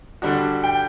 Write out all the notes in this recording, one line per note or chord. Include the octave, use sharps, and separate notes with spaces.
D3 G3 D4 F#4
G5